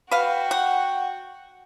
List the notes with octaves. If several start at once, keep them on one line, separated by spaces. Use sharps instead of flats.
F#4 B4 F5 G5
F#5